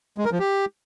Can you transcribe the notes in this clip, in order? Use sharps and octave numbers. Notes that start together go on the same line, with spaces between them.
G#3
A#4
F3
G4